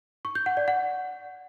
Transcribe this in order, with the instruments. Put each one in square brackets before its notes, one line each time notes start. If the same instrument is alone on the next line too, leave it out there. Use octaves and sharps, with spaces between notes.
[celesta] C#6
G6
F#5
D5
F#5